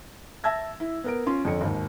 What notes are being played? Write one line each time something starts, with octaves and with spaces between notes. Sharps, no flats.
E5 A5 E6 G#6 A#6
E4
B3 A#4 D7
C#4 F4 C6
F2 D3 C#5 C#7
G#1 D#2